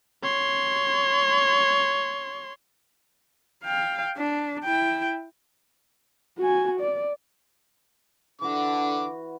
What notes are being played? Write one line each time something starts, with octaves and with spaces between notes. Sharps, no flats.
C#5 C6
F5 G5
D4
E4 G5
F#4 G#5
D5
D3 E3 F#4 D6